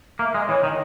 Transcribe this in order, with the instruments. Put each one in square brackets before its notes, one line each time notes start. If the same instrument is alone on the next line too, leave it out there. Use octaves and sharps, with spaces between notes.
[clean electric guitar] A#3 [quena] E5
[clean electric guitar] G#3 [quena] D#5
[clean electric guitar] E3 [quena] C#5
[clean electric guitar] D#3 [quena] E5
[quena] D#5